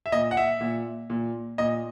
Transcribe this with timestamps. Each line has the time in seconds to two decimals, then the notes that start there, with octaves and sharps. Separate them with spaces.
0.06 E5
0.12 A#2 D#5
0.31 F#5
0.37 E5
0.61 A#2
1.10 A#2
1.58 A#2 D#5